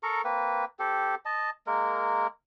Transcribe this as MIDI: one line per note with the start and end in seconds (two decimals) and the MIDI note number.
0.03 0.22 69
0.03 0.22 70
0.03 0.22 82
0.03 0.22 85
0.24 0.65 58
0.24 0.65 60
0.24 0.65 71
0.79 1.15 60
0.79 1.15 67
0.79 1.15 69
1.25 1.50 75
1.25 1.50 81
1.67 2.27 56
1.67 2.27 58
1.67 2.27 70